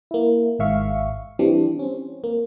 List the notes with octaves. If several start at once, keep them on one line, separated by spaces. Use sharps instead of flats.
A#3 E4
G#1 G#2 E5 F5 C#6
E3 G3 C4 D4
C4 C#4
A#3